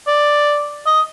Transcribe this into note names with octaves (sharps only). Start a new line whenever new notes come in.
D5
D#5